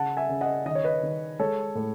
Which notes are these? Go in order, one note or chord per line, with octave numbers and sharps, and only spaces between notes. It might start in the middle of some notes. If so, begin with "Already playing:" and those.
Already playing: C#3 F#5 A5
E5 G#5
C#3
D#5 F#5
D#3 D#5
C#5
B4 D#5
D#3
G#3 A4 C#5
A2